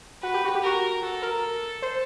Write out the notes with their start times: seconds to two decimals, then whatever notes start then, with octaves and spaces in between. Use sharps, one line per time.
0.22 F#4 B4
0.34 G4
0.45 F#4
0.55 G4
0.63 F#4 A#4
1.02 F#4 A4
1.22 A#4
1.82 C5